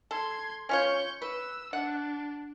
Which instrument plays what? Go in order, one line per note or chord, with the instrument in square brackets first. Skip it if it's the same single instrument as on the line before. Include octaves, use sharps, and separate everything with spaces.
[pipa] A4 [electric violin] C6 G#6
[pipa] C#4 F4 C#5 [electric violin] C#6 G6
[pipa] B4 [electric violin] E6
[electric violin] D4 [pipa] F#5